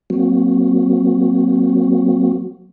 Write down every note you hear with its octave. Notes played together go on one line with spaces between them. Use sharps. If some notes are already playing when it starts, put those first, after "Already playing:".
F#3 A#3 C4 F#4